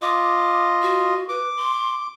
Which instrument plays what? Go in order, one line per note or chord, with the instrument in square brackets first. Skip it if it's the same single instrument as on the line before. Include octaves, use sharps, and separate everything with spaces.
[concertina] F4 D#5 [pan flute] D6
[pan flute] F#4
[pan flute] B4 [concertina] D6
[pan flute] C6